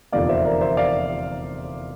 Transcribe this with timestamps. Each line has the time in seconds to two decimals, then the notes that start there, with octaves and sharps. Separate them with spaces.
0.12 F1 E2 D3 F3 A#3 D5 F5
0.29 C5 E5
0.45 A#4 D5
0.61 C5 E5
0.77 D5 F5